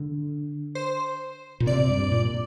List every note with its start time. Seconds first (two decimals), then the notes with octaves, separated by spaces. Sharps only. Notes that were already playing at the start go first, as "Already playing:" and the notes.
Already playing: D3
0.75 C5
1.60 A#2
1.66 C3 D5
1.90 G2
2.12 A#2